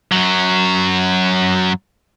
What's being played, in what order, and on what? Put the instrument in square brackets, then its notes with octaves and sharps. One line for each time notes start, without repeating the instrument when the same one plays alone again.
[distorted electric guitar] F#2 F#3